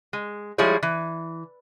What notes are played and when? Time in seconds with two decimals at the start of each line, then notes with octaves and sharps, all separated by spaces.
0.13 G#3
0.58 F3 G3 G#3 E4 G#4 C#5
0.83 E3